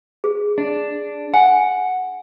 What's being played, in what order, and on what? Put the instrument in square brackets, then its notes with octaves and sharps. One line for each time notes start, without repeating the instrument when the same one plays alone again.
[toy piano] G#4
[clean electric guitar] D4
[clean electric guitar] F#5 [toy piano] G#5